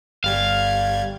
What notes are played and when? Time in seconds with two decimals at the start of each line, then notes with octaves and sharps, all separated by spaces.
0.24 G1 G3 F5 G#6